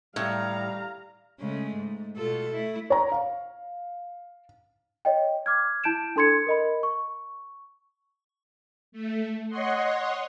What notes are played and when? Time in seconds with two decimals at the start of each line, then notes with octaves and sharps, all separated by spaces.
0.16 A2 G3 F5 A#5
1.40 C#3 G#3 A3
1.76 G#2
2.16 B2 F4 A4
2.51 A3 E4
2.90 C#5 A#5
3.12 F5
5.05 C#5 D#5 G5
5.46 D6 F6 G#6
5.84 E4 A5 G6 D7 E7
6.16 D4 A4 C6 G#6 C#7
6.47 A#4 D#5 B5
6.83 C#6
8.92 A3
9.48 C#5 D#5 F#5 C6